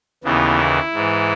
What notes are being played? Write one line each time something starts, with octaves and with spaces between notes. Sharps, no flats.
D#2 C#3 E3 B3
E4
G#2 E3